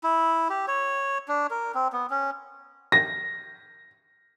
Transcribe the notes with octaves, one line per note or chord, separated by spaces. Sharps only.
E4
G4
C#5
D4
A#4
C4
B3
C#4
A#6